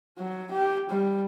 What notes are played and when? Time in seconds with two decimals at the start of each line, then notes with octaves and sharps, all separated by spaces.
0.18 F#3
0.51 G4
0.90 G3